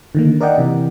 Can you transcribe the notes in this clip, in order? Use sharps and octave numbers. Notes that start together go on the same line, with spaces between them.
D3 D#3 A#3
A#4 D5 D#5 F#5 G5
C3 E3